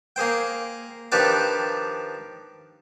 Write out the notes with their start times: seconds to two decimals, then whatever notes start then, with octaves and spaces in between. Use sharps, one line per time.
0.16 A#3 G#4 C5 G5
1.12 D#3 F3 D4 G4 B4 D5